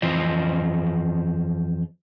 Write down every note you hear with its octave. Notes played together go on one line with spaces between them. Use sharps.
F2 E3 F4 C5 D#5